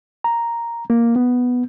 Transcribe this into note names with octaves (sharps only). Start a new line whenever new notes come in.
A#5
A#3
B3